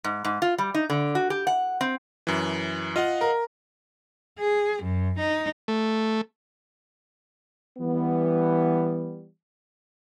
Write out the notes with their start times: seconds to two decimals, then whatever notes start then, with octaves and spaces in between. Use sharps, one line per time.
0.04 G#2
0.25 G#2
0.42 F4
0.58 G3
0.74 D#4
0.90 D3
1.15 F#4
1.30 G4
1.47 F#5
1.81 C4
2.27 F#2 E3
2.96 F4 D#5 F5 F#5
3.21 A#4
4.39 G#4
4.83 F#2
5.19 D#4
5.68 A3
7.78 E3 G3 B3